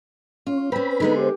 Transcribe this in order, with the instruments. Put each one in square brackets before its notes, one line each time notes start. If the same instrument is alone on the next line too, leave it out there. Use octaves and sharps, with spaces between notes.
[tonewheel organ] C#4 [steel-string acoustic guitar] F4
[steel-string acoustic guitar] C4 C#4 [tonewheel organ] B4 B5
[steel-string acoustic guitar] D3 G#3 B3 [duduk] D#4
[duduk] G4 [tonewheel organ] C5